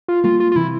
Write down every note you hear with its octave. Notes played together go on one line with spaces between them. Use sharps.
F4
G3 A#3 F4
F4
F4
C3 E3 E4